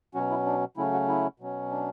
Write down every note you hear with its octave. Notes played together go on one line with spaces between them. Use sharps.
B2 F#3 C#4 F#4
E4
D4
C#3 F#3 A3 C#4 E4
F#4
E4
B2 F#3 C#4
D4